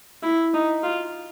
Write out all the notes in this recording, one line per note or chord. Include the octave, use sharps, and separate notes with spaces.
E4
D#4
F4